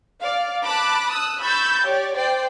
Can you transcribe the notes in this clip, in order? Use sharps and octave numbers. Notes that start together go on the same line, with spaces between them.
D5 F5
A5 B5 D6 F#6
D#6 E6 F#6
B5 C#6 E6 G6 A6
G4 C#5 D5
C5 D5 G5 C7